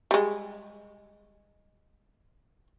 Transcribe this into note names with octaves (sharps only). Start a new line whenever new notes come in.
G3 G#3